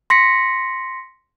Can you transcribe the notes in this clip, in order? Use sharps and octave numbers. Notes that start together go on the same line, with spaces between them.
C6 A#6 B6 C#7